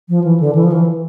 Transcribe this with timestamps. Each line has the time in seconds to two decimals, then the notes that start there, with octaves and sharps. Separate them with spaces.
0.09 F3
0.24 E3
0.40 D3
0.55 E3
0.63 F3
0.72 E3